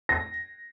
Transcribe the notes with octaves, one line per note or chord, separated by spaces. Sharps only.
A#6